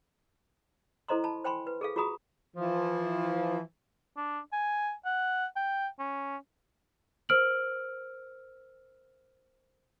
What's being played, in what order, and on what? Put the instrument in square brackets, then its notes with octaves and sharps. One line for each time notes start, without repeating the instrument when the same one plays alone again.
[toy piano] E4 A4 C5 D#5 A#5 C6
A5 B5
C5 G5 G#5 B5 C6
B4
G#4 A4 F5
F4 F#4 G#4 A#5 B5 D#6
[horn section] E3 F3
[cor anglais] D4
G#5
F#5
G5
C#4
[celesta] A#4 C5 E6 F6 D7 F#7